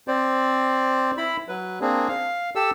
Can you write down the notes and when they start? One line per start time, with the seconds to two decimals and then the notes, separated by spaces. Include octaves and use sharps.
0.08 C4 C5 D5
1.17 E4 B5
1.48 F#3 B4
1.81 A#3 C4 D4 G#4
2.08 F5
2.55 G4 A4 E6